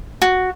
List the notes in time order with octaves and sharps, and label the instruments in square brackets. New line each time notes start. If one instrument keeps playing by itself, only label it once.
[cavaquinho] F#4